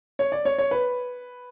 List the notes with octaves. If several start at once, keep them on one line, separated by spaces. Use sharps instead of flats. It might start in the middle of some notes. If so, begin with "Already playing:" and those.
C#5
D5
C#5
C#5
B4